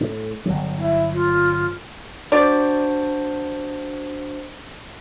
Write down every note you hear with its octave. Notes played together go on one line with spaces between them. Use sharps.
A2
G1 F#3
E4
F4
D4 F#4 C5 D5